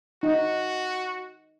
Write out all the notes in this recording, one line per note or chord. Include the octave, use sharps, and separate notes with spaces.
D#4 F#4